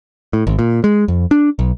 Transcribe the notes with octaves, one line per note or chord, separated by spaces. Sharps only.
A2
G#1
A#2
G#3
F2
D4
B1